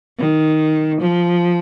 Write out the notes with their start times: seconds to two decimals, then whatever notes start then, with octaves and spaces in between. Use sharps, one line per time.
0.19 D#3
1.01 F3